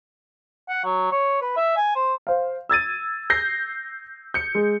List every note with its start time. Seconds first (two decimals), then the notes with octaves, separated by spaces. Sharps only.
0.69 F#5
0.84 F#3
1.11 C#5
1.41 B4
1.56 E5
1.77 G#5
1.95 C5
2.27 C5 F5
2.69 E6 G#6 A6 D#7
3.30 G6 A#6 C7
4.34 G6 C#7
4.55 G#3